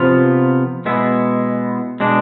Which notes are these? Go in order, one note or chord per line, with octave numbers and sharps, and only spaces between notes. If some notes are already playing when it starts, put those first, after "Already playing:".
Already playing: C3 F3 B3 F4
B2 G#3 B3 E4
B2 G#3 D4